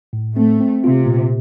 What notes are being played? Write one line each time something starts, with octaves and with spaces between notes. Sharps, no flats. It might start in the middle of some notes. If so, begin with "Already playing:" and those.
A2
A3 C4
C4
C3 F4
A#2